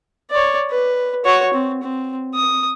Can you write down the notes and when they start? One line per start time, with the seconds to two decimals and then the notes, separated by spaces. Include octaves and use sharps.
0.31 C#5 D5
0.71 B4
1.25 F#4 C#5
1.54 C4
1.83 C4
2.35 D#6